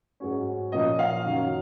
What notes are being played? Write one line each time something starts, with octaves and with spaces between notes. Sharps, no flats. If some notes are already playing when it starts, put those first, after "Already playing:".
G#2 F#3 C#4
A#2 F3 A#3 C#4 D#5
F5
F#2 D#3 F#3 C#4